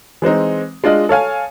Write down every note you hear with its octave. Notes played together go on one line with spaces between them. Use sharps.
E3 G#3 C4 D#4
G#3 D4 F4 D#5
A4 C#5 F5 G#5